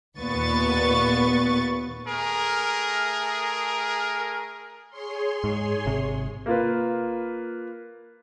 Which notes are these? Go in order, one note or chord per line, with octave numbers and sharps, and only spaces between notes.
D#2 A#2 B3 B4 C#6 A6
A3 G#4 A#4
G#4 C#5 C6
G#2
G#1 C3
A#3 F4 B4